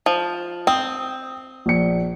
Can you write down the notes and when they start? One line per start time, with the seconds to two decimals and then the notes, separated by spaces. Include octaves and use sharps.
0.06 F3
0.67 C4 D#6
1.66 A#1 C#7